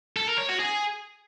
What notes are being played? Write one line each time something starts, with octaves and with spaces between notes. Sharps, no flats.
A4
A#4
C#5
F#4
G#4